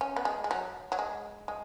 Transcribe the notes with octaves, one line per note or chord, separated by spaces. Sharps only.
C#4
B3
G#3
G#3
F#3
F#3
G#3
G#3